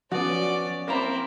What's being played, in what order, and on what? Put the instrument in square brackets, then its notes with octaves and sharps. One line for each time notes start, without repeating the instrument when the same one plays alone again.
[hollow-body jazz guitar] F3 [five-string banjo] B3 F#4 [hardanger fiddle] C#4 D5
[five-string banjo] A#3 [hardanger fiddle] C4 E4 [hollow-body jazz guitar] A#4 F5 A#5